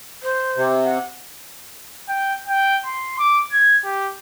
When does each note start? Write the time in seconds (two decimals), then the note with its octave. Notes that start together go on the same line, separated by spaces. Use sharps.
0.22 C5
0.57 C3
0.84 F#5
2.09 G5
2.48 G5
2.86 C6
3.19 D6
3.52 G#6
3.84 G4